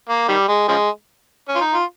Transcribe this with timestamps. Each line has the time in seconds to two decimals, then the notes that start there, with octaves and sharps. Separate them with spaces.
0.09 A#3
0.28 D#3 G3
0.49 G#3
0.68 C#3 F3 G#3
1.48 C#4
1.56 F4
1.61 D#4
1.74 F4